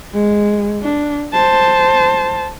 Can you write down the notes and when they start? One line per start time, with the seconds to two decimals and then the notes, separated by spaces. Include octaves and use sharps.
0.14 G#3
0.82 D4
1.33 C5 A5